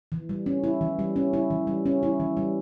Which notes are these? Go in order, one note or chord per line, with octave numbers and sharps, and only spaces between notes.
E3
G3
C#4
E4
E3
G3
C#4
E4
E3
G3
C#4
E4
E3
G3